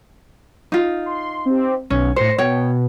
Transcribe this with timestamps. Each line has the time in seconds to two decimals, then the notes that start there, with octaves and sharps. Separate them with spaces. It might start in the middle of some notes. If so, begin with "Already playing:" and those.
0.72 D#4 F4
1.06 C6
1.46 C4 G4
1.90 B1 C#4
2.16 A2 C5 A#6 C#7
2.38 B2 C#5 G5